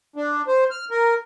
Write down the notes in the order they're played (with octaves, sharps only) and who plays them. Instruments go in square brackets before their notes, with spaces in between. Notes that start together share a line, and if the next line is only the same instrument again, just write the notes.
[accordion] D4
C5
F6
A#4